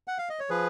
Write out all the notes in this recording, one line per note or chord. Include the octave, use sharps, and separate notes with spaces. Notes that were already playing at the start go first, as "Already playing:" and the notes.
F#5
F5
D#5
C#5
F3 G#4 B4